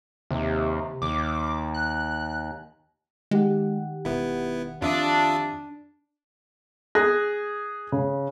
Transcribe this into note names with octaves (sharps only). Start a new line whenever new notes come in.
D#2 C3
D#2 D6
F#6
D#3 G#3 G4 F#5
E1 B3 E4
F2 D4 F4 E5 D#6
G#4 F#6 A#6
C#3